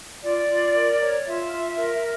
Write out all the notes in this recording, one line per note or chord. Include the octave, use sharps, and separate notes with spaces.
F4 D5
F4
A#4
C#5
F4 E5
F4
A#4